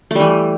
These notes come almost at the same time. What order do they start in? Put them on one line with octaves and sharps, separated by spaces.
A3 G3 E3